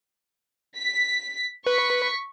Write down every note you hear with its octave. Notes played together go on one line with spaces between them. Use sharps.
B6
B4 C#6 B6